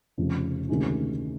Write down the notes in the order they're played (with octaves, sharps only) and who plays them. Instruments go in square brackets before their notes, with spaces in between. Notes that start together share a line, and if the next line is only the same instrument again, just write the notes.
[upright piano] F1 F2 C#3
D2 C3 D#3 G#3 C#4